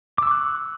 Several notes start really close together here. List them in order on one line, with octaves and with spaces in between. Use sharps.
D6 E6 C#6 F#6